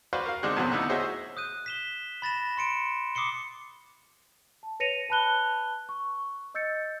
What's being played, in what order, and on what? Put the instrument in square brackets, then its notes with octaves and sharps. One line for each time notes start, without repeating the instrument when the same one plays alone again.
[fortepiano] F#4 B4 C5 D5 F5 C#6
A#4 F5
D3 G#3 C4 D4 D#4 G#4
E2 A#2 C#3 F#3 B3 C4
D3 A3 B3 D#4 E4
F#4 G#4 C5 C#5 D#5 E5
[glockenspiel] D#6 F#6 G6 D#7
B6 E7 G7
B5 A6 A#6 E7
C6 C#7 D7 E7
D6 D#6 C7 C#7 G7
[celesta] A5
B4 C#5 A#6 C#7 D#7 F7
B4 A5 B5 F#6 G7
C#6
D#5 E6 G6 A6 C#7